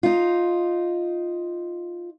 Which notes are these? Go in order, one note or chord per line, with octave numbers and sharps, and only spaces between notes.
D#4 F4